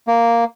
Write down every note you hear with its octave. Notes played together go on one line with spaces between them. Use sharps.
A#3